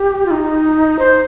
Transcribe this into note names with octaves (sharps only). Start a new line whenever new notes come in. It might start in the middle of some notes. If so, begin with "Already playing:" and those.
Already playing: G4
F4
D#4
C5